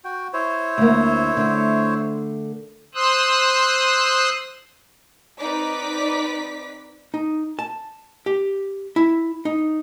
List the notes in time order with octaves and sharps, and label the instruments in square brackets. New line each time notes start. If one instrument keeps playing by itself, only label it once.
[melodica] F#4 G5
E4 C5 C#5
[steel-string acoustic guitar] D2 A#3
D3 A3
[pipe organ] C5 C6 D#6 E6 F#6
[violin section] C4 D#4 B4 D5 D6 B6
[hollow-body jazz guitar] D#4
A5
G4
E4
D#4